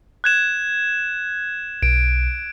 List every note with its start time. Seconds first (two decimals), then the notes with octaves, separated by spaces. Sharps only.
0.24 F#6 G#6 E7
1.83 B1 D7